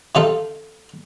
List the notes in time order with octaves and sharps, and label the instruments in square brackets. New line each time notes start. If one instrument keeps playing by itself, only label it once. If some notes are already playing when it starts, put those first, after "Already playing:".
[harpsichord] C3 D#4 F4 A4